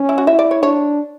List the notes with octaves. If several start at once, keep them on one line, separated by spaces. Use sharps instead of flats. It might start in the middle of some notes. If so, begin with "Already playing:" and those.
Already playing: C#4
E4
F#4
E4 E5
D5
C#5
D4 C#5